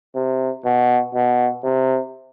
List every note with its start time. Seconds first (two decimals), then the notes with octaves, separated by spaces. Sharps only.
0.15 C3
0.64 B2
1.14 B2
1.64 C3